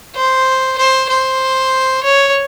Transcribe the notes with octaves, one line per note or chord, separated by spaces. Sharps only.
C5
C5
C5
C#5